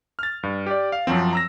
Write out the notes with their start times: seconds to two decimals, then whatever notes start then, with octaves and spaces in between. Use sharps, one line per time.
0.19 F6 A6
0.43 G2
0.66 G4 D5
0.92 F5
1.07 F#2 F3 F#3 C4
1.33 A#5 E6 A#6